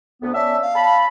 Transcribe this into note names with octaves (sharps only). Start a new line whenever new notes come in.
D2 B3
C#4 D5 E5 A5
F5
A5 B5